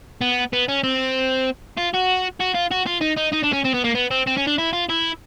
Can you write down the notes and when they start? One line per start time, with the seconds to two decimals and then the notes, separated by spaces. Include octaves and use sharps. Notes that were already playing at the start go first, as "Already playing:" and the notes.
0.21 B3
0.53 B3
0.69 C#4
0.84 C4
1.77 F4
1.94 F#4
2.40 F#4
2.55 F4
2.71 F#4
2.86 F4
3.01 D#4
3.17 D#4
3.33 D#4
3.44 D4
3.53 C#4
3.65 C4
3.74 B3
3.84 A#3
3.95 B3
4.11 C4
4.27 C4
4.37 C#4
4.47 D4
4.58 E4
4.73 F4
4.89 E4